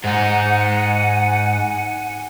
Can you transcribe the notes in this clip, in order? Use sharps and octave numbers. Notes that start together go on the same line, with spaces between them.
G#2 D#4 F#5 G#5